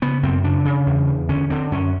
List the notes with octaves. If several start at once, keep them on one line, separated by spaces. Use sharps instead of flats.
C#3 B3
F#2 C4
C#3 D4
C#3
E2
E2
D3 C#4
D3 C4
F#2 C#4